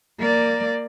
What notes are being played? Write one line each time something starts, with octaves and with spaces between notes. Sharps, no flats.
A#3 D5